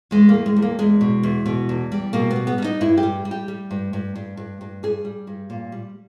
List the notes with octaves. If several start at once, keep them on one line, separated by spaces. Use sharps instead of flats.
E2 G#3
G3 A#3
G#3
E2
A#3
E2 G#3
B2
E2
B2
E2
G3
B2 A#3
B3
G3
B3
G3
D#4
G2 E4
G4
G3
G3
G4
G3
G2
G2
G2
G2
G2
G3 G#4
G3
G2
A#2
G3